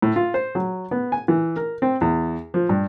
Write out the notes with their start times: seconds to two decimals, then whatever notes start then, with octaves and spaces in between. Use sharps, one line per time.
0.02 A2
0.16 F4
0.34 C5
0.55 F#3
0.91 B3
1.12 G#5
1.28 E3
1.56 A#4
1.82 C4
2.01 E2
2.54 F3
2.69 G2